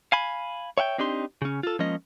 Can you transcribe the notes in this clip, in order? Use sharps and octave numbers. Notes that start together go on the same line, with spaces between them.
F5 G#5 B5
C#5 E5 F#5 G5
C4 D4 D#4 G4 C6
C#3 C#4
F4 A4
F3 G#3 A#3 C#4 D#5